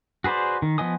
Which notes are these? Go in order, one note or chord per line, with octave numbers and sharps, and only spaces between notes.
F#4 G#4 B4 C5 D5
D#3
F3 B3 D#5 G#5 D#6